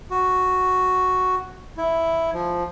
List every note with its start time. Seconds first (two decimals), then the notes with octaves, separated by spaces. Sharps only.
0.11 F#4
1.77 E4
2.33 F3